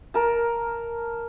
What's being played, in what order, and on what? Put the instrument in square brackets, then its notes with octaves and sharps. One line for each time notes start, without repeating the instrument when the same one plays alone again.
[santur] A#4 A5